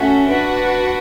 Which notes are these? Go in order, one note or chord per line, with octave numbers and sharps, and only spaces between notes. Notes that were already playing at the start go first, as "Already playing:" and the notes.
Already playing: A3 C#4 F#4 A4 E5
D4 F#4 B4